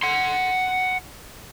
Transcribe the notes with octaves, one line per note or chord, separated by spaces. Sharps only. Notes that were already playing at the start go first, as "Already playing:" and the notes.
F#5 C6